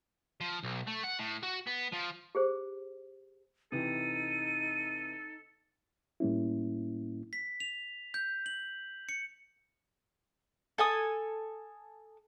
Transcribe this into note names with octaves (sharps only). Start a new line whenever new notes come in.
F3
B1
A3
F#5
A2
F#4
B3
F3
G4 G#4 C5
C3 E3 D#4 A4 D#7
A2 G3 A#3 C#4 E4
B6
F7
G6
F#7
C#7
A4 G#5 D#6